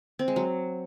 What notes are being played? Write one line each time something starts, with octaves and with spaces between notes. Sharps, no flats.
C4
G#3
F#3